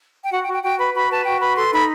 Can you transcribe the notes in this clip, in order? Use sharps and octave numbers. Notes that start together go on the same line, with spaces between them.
G5
F#4 F#5
G5
F#4
G5
F#4 G5
B4 B5
F#4 B5
B4 A5
F#4 G5
B4 B5
A4 C6
D#4 B5